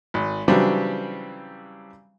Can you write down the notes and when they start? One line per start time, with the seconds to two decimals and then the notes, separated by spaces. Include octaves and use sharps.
0.14 G#1
0.48 C#3 E3 F#3 G3 C4 D4